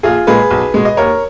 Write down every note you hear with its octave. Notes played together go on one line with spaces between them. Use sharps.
A#1 F4 G#4
A#2 G#3 G#4 B4
B1
B2 G#3
D#5
D#2 A#4 C#5